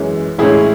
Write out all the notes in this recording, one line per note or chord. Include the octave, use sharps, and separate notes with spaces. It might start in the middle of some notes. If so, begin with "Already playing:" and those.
Already playing: F#2 E3 G#3 C#4
A1 A2 G#3 C#4 E4 G#4